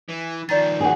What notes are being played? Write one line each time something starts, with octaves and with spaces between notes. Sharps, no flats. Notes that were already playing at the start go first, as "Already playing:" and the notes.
E3
D#3 F3 D5 A#5 A6
F#4 G#4